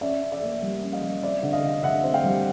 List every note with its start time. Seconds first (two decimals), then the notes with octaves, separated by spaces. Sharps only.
0.01 C#4 D5 E5
0.22 C#4
0.32 D5 E5
0.42 A#3
0.62 G3
0.83 C#4
0.93 D#5 F5
1.02 G3
1.22 C4 D5 E5
1.43 D3
1.53 D#5 F5
1.63 D3
1.83 D3 E5 F#5
2.03 C4
2.14 F5 G5
2.24 G3